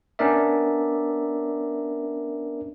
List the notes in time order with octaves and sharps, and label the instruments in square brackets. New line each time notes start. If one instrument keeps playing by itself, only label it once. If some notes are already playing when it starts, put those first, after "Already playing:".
[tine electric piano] B3 C#4 D4 A#4 D5 E5